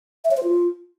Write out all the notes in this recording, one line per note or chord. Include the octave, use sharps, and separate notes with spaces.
E5
C#5
C5
F4